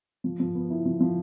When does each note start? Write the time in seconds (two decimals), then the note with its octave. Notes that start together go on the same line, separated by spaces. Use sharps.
0.24 F3
0.40 F3
0.55 B3
0.70 E4
0.85 F3
1.00 F3